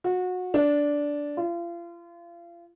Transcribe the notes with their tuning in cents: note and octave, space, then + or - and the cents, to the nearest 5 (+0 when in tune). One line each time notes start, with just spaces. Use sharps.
F#4 -25
D4 -10
F4 -35